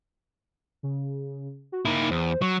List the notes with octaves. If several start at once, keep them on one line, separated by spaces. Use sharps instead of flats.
C#3
F#4
A#3 D#4 E4
E2 C5
F#3 C#6